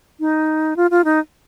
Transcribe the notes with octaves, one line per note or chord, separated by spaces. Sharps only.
D#4
F4
F4
D#4